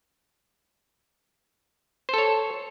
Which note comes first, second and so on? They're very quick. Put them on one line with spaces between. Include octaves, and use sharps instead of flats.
C5 A4 C#5